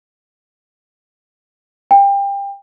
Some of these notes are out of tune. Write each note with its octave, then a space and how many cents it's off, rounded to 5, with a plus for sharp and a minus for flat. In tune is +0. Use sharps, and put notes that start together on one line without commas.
G5 +30